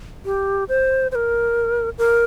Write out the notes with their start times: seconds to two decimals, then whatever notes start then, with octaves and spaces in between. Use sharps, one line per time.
0.25 G4
0.69 C5
1.12 C5
1.15 A#4
1.98 A#4